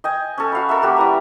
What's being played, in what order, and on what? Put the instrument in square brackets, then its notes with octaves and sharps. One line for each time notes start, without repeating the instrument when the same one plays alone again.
[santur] D#5 G5 G#5
C#4 A4
F#4 F5 F#5 B5
A4 A#4 E5
A#3 F#4 G4 A#4
G3 E4 B4 A#5